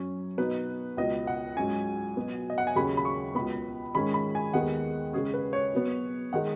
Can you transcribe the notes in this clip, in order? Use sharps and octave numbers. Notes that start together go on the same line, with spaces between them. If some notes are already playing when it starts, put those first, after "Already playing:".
Already playing: F#2 F#3 C#4
B2 B3 D#4 B4
C#2 B2 B3 D#5
F#5
G#2 F#3 C#4 G#5
B2 F#3 B3
D#5
F#5
G#5
D#2 C#3 F#3 C#4 B5
B5
C#6
C#2 B2 B3 B5
G#2 D#3 G#3 C#4 B5
B5
G#5
D#2 D#3 G#3 B3 F#5
C#3 G#3 C#4 G#4
B4
C#5
B2 F#3 B3
D#3 G#3 F#5